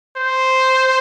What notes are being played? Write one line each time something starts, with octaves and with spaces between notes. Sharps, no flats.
C5